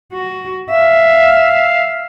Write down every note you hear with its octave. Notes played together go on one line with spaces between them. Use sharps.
F#4
E5 F5